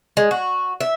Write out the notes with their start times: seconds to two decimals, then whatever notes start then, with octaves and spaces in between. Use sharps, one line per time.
0.17 G#3
0.31 F#4
0.81 E5